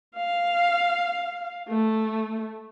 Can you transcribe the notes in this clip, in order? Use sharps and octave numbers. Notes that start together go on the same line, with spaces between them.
F5
A3